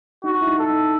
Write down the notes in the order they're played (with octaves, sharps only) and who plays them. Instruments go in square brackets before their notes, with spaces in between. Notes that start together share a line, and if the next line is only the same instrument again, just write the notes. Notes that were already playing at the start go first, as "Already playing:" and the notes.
[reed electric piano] D#4 [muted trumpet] F#4
[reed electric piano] E4
D#4
[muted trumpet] A4
[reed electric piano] D#4